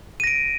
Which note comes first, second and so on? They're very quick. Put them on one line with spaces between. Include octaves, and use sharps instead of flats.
D#7 A#6 D7